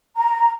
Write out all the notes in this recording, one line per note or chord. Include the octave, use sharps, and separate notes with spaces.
A#5